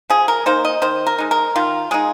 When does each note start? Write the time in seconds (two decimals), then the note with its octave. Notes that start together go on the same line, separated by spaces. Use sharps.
0.10 F3 G#4
0.28 A#4
0.46 A#3 D#4 C5
0.65 D#5
0.82 D#3 C5
1.07 A#4
1.18 G#3 D#4
1.31 A#4
1.56 D#3 F4
1.91 G#3 D#4 G#4